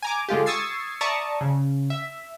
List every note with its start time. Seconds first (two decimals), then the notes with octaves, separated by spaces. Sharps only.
0.02 G#5 A#5 D6
0.29 D3 G#3 F4 G4
0.46 C#6 D#6 E6 G#6 A6 C7
1.01 D5 E5 A5 A#5 C#6 D#6
1.41 C#3
1.90 E5